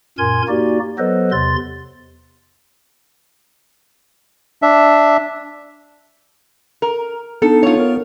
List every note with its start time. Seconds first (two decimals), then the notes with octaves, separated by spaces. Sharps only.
0.18 F#2 A#2 A#4 G#5 C6 G#6
0.48 A#3 D#4 F#4 G4 D5
0.98 F#3 B3 A4 B4 C5 D#5
1.32 E2 C3 C6 A6
4.62 D4 E5
6.82 A#4
7.42 B3 D4 D#4 A4
7.63 F4 C#5
7.76 B3 A#4